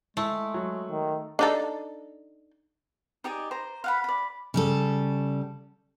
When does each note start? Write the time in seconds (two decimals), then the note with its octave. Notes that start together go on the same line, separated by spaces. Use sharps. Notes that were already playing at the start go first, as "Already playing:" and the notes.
0.17 G#3 A3 E4
0.54 F#3
0.90 D#3
1.39 D4 D#4 A4
3.24 D#4 G4 G#4 D5
3.51 C5 A#5
3.84 F5 F#5 B5
4.04 D5 B5
4.54 C#3 G3 A4